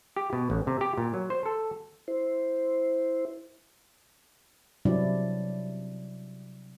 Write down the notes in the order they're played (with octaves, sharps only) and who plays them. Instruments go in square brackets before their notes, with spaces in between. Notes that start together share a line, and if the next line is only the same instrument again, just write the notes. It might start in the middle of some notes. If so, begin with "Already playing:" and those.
[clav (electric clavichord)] G4
B2
A1
C3
G4
A#2
F#3
C5
A4
[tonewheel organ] E4 C5
[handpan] C3 F#3 G3 D4 E4 D5